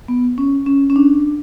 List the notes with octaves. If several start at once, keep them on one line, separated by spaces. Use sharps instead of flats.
B3
C#4
C#4
C#4
D4